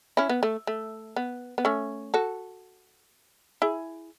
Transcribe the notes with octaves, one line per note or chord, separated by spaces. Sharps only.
C#4 E4
B3
A3
A3
B3
B3
A3 C#4
F#4 A4
E4 G#4